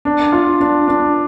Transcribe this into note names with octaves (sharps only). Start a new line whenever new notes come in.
D4
F4
D4
D4